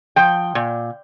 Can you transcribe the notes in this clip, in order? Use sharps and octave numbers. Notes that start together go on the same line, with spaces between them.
F3 G5
A#2